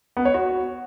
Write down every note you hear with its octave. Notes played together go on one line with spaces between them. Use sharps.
B3
C#5
F#4